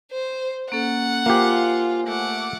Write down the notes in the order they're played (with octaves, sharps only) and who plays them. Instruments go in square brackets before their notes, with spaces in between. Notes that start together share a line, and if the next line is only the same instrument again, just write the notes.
[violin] C5
[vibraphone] A#3 C#4 A4 [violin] F#5
[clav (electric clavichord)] A#3 G4 [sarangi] F4 [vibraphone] C5 G#5
[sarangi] A3 [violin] F#5 D6